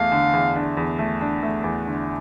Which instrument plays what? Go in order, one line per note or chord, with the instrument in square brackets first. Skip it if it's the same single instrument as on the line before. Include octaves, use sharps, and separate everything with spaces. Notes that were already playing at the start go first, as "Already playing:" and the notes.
Already playing: [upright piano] E2 A3 [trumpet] F5
[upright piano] D3
E2
D4
E2
A3
D4
A3
E2
D3